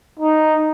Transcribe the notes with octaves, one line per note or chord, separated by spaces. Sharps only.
D#4